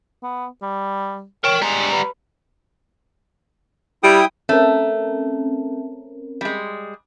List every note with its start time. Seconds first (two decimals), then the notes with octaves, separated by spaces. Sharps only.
0.23 B3
0.62 G3
1.44 A#4 C#5 G5
1.62 G3 G#3 A#5
1.92 B4
4.03 G3 E4 G5 D#6
4.49 A3 C4 C#4 A#4
6.41 G3 G#3